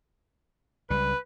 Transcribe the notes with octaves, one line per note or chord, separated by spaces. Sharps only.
C#2 G3 B4